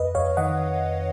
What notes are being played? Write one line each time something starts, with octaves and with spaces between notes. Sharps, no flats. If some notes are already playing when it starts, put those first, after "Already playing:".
Already playing: F2 B4 D#5
F2 C#5 F5
D#3 D#5 F#5